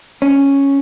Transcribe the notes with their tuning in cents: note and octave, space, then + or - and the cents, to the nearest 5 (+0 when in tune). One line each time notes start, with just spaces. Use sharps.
C#4 +0